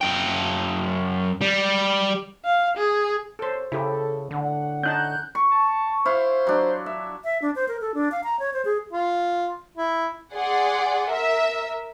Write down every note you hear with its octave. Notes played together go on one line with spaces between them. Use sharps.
F#2 G5
G3
F5
G#4
C2 A4 C5 C#5
C#3 E4 G4 A4
A2 D3 F#5
C#4 D#4 A5 F#6 G6
C#6
A5
E4 C5 F5
F#3 D4
E5
E5
D4
C5
A#4
A4
D4
F5
A#5
C#5
C5
G#4
F4
E4
G#4 D5 F#5 C6
A#4 E5